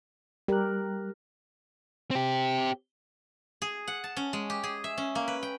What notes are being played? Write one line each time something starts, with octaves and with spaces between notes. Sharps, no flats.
G3 G4 A#4 F#6
C4 G4
G#4
F#5
A5
C#4
G#3
G4
G#4
E5
C#4
A#3
B4
G5